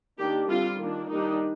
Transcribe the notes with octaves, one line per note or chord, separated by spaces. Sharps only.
D#3 A#3 D4 G4
D3 G3 C4 F4
D#3 A#3 D4
D#3 G3 A#3 D4 D#4